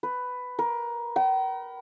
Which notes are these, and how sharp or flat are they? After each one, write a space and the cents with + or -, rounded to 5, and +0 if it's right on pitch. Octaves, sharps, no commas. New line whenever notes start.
B4 +10
A#4 +20
G5 -45